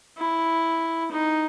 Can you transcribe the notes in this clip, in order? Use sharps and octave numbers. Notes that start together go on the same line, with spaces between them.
E4
D#4